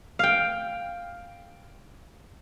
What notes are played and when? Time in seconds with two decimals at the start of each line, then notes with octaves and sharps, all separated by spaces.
0.19 F5 G5